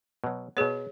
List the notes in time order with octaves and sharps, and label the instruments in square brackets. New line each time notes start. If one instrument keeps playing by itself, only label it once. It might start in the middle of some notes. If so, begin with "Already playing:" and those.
[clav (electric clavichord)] B2 F#3
[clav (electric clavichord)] B2 B3 [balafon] G#4 C#5